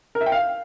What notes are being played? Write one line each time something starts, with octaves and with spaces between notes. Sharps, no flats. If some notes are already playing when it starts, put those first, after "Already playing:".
A#4
E5
G5
F5